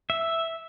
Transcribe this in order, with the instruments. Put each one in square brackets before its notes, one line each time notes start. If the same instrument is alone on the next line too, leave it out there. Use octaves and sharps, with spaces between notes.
[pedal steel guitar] E5